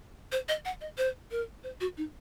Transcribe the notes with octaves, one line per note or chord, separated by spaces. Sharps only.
C5
D#5
F#5
D#5
C5
A#4
C5
F#4
D#4